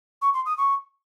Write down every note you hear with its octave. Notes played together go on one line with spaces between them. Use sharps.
C#6
C6
D#6
C#6